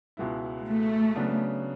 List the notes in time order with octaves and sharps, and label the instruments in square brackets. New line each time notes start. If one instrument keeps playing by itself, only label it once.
[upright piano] C#2 B2 G#3 B3 E4
[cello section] A3
[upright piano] C#3 F#3 B3 D4